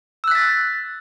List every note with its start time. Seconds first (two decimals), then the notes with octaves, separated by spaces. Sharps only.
0.24 E6
0.28 F#6
0.31 B6
0.35 A6